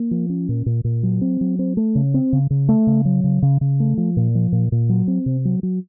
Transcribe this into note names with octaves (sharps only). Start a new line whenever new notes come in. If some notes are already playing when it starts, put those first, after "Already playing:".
Already playing: A#3
F3
C#4
A#2
A#2
A#2
F#3
C4
F#3
C4
A3
C#3
C4
C#3
C#3
A3
C#3
F#3
C#3
C#3
C#3
A3
F3
A#2
F3
A#2
A#2
F#3
C4
C3
F#3
F#3